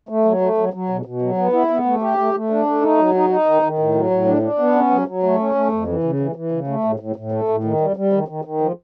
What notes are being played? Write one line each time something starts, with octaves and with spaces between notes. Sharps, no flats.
A3
F#3
A3
F#3
F#3
B2
B2
F#3
B3
E4
B3
A3
G4
A3
A3
D4
A3
D#4
F#3
D#4
D#4
D#3
D#3
A2
F#3
A2
D4
D4
B3
C#4
F#3
F#3
A3
C#4
A3
F2
E3
C#3
E3
E3
C#3
A3
A2
A2
A2
A3
A2
D#3
G3
G3
D#3
D#3
D#3
F3